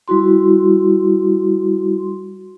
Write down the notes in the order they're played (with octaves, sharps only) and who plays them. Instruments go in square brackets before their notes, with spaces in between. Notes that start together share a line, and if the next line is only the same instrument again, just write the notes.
[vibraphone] G3 E4 F#4 C6